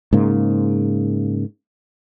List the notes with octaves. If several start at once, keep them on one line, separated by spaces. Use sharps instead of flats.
G#2 C#3 A#3